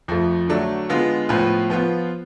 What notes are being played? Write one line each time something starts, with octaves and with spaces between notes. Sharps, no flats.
F2 F3 A3
D3 F#3 A3 D4
D3 G#3 B3 F4
A2 F3 B3 F4 B4
F3 B3 F4